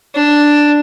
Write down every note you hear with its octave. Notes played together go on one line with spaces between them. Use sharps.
D4